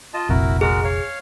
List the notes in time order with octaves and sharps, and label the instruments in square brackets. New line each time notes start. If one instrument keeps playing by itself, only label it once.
[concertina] F4 D#5 A5
[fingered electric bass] F1 A#1 C4 [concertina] E4 F#4 A#4
[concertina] G#3 F#4 A#4 [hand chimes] G#4
[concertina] C#5 F5